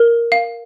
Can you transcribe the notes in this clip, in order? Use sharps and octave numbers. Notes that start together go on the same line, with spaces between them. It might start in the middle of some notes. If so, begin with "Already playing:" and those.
Already playing: A#4
F5